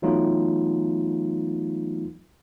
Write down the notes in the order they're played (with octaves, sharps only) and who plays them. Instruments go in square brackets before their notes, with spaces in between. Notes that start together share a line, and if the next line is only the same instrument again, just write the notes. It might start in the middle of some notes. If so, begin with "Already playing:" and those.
[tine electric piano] E3 F#3 A3 B3 D#4 F4